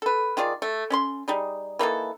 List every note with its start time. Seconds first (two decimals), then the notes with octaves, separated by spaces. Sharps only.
0.02 A4 B4
0.37 D#3 F4 G#4 D5
0.62 A3
0.90 C#4 D5 C6
1.28 G3 D#4 G#4
1.79 E3 A#3 D#4 A4